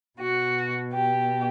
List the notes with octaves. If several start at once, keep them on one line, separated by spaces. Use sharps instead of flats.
B2 F#4
G4